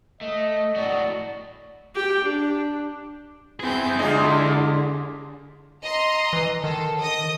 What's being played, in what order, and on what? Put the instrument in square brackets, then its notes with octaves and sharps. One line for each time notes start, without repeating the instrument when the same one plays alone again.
[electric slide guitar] A3 [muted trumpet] D#5
[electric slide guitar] A2 F#3 F#4 [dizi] D5
[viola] G4 G5
D4
[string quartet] C4 G#5 G6 [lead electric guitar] E4 G#4
[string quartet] D3 [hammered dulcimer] G#3 [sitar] D4 F4 G4
[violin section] D#5 A#5 C6
[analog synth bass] E3
[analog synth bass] D#3 [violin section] A4
[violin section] D#5 D#6